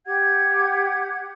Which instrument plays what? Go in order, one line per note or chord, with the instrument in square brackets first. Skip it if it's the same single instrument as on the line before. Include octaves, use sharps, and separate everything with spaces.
[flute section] G4 F#5 G#6